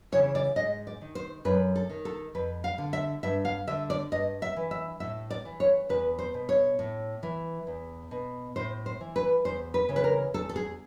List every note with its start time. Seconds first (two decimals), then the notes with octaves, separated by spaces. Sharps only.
0.12 C#3 E3 C#5
0.35 D5
0.56 G#2 D#5
0.87 D5
1.01 D#3
1.15 C5
1.45 F#2 B4
1.76 A4
1.90 D#3
2.05 A4
2.35 F2 B4
2.64 F5
2.78 D3
2.93 E5
3.23 G2 E5
3.45 F5
3.67 D3 E5
3.90 D5
4.12 G2 D#5
4.42 E5
4.56 E3
4.71 E5
5.00 A2 E5
5.30 D5
5.45 E3
5.60 C#5
5.89 E2 B4
6.19 C5
6.34 B2
6.49 C#5
6.79 A2
7.23 E3
7.67 E2
8.11 B2
8.56 A2 C5
8.86 C5
9.01 E3
9.16 B4
9.45 E2 C5
9.74 B4
9.89 C#3 E3
9.96 B4
10.04 A#4
10.34 E2 A4
10.49 A4
10.56 G#4